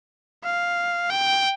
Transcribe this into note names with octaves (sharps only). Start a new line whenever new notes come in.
F5
G5